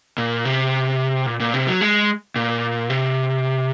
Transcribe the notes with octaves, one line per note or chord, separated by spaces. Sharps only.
A#2
C3
A#2
A#2
C3
F#3
G#3
A#2
C3